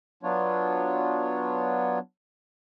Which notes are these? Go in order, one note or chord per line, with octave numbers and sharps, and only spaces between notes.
F#3 B3 D4 F4 C#5